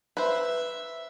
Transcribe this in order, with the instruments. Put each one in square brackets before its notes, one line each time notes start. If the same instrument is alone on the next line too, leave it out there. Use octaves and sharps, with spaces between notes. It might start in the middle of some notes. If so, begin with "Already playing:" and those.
[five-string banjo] B4 C5 [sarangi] E5